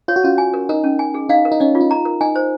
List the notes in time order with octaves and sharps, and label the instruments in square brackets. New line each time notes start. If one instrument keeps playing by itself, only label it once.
[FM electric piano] F4 [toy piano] C#5
[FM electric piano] F#4
[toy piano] C#4 [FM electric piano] F4
[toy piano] G#5
A#4
[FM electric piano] D#4 [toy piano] A#4
[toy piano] C#4
G#5
G#4
[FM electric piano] D#4 [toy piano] F5
[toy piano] A#4
[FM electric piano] D#4
[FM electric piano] C#4 [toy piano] D#5
[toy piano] F4
[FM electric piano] D#4
[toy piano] A#5
A#4
[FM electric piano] D#4 [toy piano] G#5
[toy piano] C5